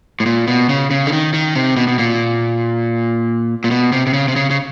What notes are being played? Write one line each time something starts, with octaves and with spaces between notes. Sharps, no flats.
A2
A#2
B2
C#3
C#3
D3
D#3
D#3
C3
B2
B2
A#2
A#2
B2
C3
C3
C#3
C3
C#3
C#3